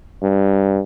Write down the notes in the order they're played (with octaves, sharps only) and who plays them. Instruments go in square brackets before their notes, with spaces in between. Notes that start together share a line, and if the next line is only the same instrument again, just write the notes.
[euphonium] G2